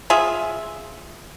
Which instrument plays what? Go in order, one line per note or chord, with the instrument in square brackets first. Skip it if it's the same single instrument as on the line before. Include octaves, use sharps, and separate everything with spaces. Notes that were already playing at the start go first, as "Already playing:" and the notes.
[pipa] F4 G#4 E5